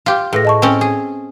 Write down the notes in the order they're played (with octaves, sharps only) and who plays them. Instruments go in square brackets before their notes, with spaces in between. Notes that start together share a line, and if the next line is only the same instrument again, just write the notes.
[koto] F4 G4
[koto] A2 [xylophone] G#4 B4 A#6
[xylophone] D#5 A5 C#6
[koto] C4 C#4
G#4